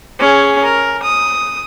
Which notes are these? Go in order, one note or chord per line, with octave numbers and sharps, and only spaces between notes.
C#4 G#4
A#4
D#6